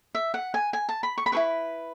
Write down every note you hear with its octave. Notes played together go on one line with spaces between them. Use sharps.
E5
F#5
G#5
G#5
A5
B5
C#6
B5
E4 G#4 B4 C#6